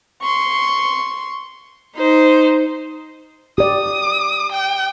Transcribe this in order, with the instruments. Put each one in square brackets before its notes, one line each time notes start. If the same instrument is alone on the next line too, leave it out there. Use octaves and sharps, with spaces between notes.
[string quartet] C6 C#6
[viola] D#4 C5
[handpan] G4 D5 [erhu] D#6
[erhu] G5